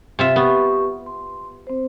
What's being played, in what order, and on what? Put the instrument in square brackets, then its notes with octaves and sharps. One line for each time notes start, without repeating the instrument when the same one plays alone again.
[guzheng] C3 F4 E5
[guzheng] B3 [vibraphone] G4 C#6
[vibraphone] C6
C4 C5